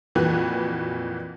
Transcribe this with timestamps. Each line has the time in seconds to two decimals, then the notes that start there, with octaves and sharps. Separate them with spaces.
0.15 F2 A#2 E3 F#4 B4 F#6